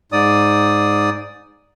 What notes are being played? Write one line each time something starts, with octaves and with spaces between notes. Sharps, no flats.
G#2 D5 D#6